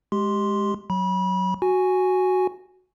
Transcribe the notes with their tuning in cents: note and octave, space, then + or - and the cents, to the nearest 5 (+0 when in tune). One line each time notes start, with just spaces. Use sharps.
G#3 +0 G4 +0 C6 +0
F#3 +0 B5 -30
F#4 +0 G#5 +0